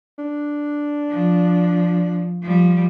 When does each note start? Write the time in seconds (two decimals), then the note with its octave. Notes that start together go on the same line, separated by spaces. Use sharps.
0.18 D4
1.10 F3
2.42 F3 G3